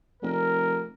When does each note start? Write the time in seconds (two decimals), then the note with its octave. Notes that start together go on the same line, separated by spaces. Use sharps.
0.22 F1 A#4